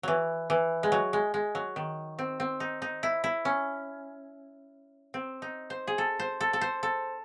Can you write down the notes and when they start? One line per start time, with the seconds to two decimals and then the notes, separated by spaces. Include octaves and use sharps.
0.03 E3 F#3
0.50 E3
0.83 G#3
0.92 F#3
1.13 G#3
1.34 G#3
1.55 F#3
1.76 D#3
2.19 C4
2.40 C4
2.60 D#4
2.82 D#4
3.03 E4
3.24 E4
3.45 C#4
5.14 C4
5.42 D#4
5.70 C5
5.87 G#4
5.98 A4
6.19 C5
6.40 A4
6.53 A4
6.61 C5
6.83 A4